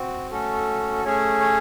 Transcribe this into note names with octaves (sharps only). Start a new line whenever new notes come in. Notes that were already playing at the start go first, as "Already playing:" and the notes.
Already playing: C4 F#4
A3 C#4 F#4 A4
A3 C#4 G#4 C#5
C#5